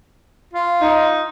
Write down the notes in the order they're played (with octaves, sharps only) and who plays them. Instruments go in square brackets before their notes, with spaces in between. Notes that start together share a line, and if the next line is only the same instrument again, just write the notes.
[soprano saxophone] F4
[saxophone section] D#4